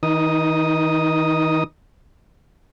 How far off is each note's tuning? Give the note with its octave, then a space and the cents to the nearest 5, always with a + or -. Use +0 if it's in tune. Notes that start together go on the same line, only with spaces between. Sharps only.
D#3 +45 D#4 +0 D#6 +0